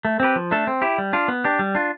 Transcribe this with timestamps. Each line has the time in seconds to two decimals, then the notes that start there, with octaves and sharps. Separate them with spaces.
0.05 A3
0.20 C4 G4 B4
0.36 F3
0.51 A3 D4 A4
0.67 C4
0.82 E4 G4
0.98 G3
1.13 D4 F4
1.28 B3
1.44 D4 G4
1.59 G3
1.75 D4 F4